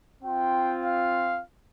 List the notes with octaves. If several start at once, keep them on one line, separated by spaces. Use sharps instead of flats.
C4 F4 G5
F5